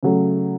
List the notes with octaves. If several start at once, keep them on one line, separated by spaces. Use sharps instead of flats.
C#3 F#3 A3